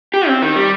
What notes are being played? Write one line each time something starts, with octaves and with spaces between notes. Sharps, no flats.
G4
C4
D#3
G3